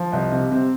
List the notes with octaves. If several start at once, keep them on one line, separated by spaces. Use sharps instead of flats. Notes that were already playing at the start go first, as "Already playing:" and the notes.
Already playing: F3
C2 D#5
C3
C3 C4